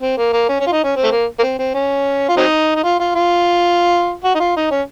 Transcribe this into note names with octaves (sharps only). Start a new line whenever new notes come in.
C4
A#3
A#3
C#4
C#4
F4
D#4
C#4
C4
A3
A#3
A#3
C4
C4
C#4
F4
F#3 C4 D#4
D#4
F4
F4
F4
F#4
D#4
F4
D#4
C#4